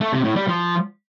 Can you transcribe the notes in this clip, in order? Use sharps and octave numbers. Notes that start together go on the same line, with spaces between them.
A3
C3
A2
G3
F3